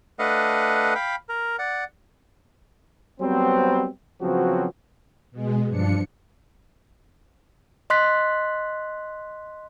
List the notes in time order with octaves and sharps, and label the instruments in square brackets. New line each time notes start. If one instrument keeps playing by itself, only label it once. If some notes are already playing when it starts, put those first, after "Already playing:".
[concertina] A3 D4 B4 D#5 F5 F#5
F5 G5 B5
A#4
D5 F#5
[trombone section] F#3 G3 B3 C4
C#3 F3 F#3 B3 C4 F#4
[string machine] B2 G#3
G2 F3 D4 C#7
[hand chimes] D#5 C6 F#6 B6